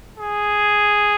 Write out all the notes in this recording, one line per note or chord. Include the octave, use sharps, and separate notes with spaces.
G#4